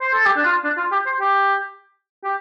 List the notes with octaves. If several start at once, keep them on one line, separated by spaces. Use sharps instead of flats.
C5
A4
G4
D4
F4
D4
F4
G4
C5
G4
G4